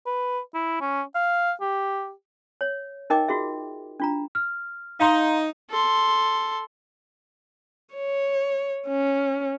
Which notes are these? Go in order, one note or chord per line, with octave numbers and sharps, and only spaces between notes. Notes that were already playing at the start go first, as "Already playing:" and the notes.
B4
E4
C#4
F5
G4
C#5
D#4 A#4 D#5 G5 D6
F4 F#4 G#4 E5
D4 F4 A#5
F6
D#4 F5 A#5 C6
A4 C6
C#5
C#4